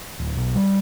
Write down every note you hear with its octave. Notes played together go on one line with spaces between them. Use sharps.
D1
B1
G3